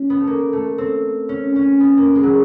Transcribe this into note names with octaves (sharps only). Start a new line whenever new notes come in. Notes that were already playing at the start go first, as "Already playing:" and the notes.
Already playing: C#4
B3
A3
A#3
A3
C4
C#4
C#4
B3
A#3
G#3
F#3